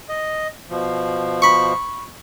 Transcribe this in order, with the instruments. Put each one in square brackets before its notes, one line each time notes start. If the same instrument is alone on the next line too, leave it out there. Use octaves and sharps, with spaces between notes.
[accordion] D#5
B2 F3
[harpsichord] B5 C#6